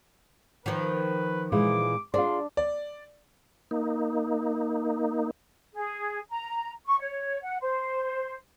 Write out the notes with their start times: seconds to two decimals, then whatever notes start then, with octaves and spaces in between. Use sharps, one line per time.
0.66 D#3 F3 B4
1.52 A#2 E3 G#3 D6
2.14 D4 F4 G#4 D5 C6
2.57 D5
3.71 A#3 D#4
5.73 G#4
6.30 A#5
6.85 C#6
6.99 C#5
7.42 F#5
7.61 C5